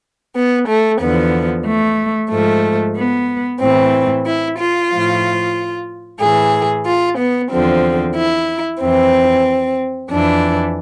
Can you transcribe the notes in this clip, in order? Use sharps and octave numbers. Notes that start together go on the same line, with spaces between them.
B3
A3
E2 D3 F3 B3
A3
G#2 F3 A3
B3
A2 E3 C4
E4
F4
A2 F3
A2 E3 G#4
F4
B3
E2 D3 F3 C4
E4
F2 E3 C4
F2 E3 D4